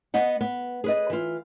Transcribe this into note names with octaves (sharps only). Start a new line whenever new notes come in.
B3 D#5 F#5
B3
G#4 B4 D#5
E3 F4